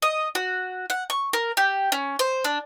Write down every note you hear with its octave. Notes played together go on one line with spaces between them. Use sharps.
D#5
F#4
F#5
C#6
A#4
G4
C#4
C5
D4